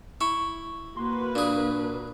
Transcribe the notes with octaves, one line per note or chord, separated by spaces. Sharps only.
E4 C#6
A#3 F#4 B4 C6
A#2 D4 G#4